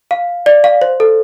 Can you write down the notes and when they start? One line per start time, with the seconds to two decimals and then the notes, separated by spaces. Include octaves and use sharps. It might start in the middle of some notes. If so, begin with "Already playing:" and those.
0.11 F5
0.46 D5
0.64 F5
0.82 C5
1.00 A4